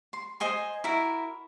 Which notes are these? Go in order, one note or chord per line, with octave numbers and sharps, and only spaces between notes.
C6
C5 D#5 G#5 C6
E4 F#4 A#4